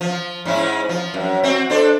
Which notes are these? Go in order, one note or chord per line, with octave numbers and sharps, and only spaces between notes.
F3
G#2 C#4 E4
F3
F#2
C4 F#4
D4 A4 C5